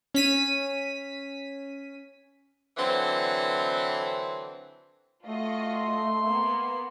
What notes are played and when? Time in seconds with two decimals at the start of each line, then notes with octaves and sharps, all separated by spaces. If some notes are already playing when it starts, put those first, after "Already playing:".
0.14 C#4 B6 D#7
2.78 D3 E3 F#3 C4
5.26 A3 F4 F#4 D#5
5.72 C6
6.23 A#3 B3